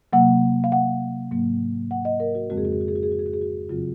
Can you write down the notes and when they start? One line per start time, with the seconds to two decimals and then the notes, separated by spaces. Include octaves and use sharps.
0.13 C3 F#3 A#3 F#5
0.64 F5
0.72 F#5
1.31 G#2 F#3 A#3
1.91 F#5
2.05 D#5
2.20 A#4
2.35 F#4
2.50 F2 C#3 F3 G#3 C4 F#4
2.57 G#4
2.65 F#4
2.72 G#4
2.81 F#4
2.88 G#4
2.96 F#4
3.03 G#4
3.12 F#4
3.19 G#4
3.26 F#4
3.33 G#4
3.41 F#4
3.69 F#2 C#3 F#3 C4 F4